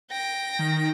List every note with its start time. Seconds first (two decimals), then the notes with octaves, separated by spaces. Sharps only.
0.11 G5 A#6
0.59 D#3